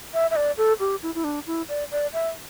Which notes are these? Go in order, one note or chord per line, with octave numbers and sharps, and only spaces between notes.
E5
E5
D5
A4
G4
E4
E4
D4
E4
D5
D5
E5